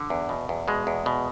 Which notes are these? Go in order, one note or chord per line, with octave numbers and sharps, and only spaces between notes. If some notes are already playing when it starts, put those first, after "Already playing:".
Already playing: D3
E2
B2
E2
B2 G#3
E2
B2